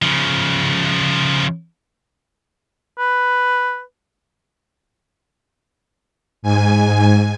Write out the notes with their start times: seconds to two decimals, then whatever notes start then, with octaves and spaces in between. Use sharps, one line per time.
0.02 C#3 F3
2.98 B4
6.42 G#2 G#5